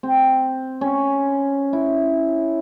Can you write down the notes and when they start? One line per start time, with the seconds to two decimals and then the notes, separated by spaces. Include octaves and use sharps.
0.03 C4
0.81 C#4
1.73 E4